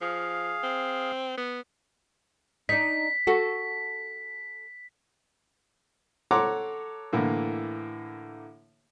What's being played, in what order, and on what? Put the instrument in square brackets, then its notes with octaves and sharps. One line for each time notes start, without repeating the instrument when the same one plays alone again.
[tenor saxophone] F3 [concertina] G#4 F5
[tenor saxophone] C4
B3
[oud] D4 D#4 [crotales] B6
[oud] F#4 A4
[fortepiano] A4 C#5 F#5 A#5 C6 D6
A2 D3 E3 A#3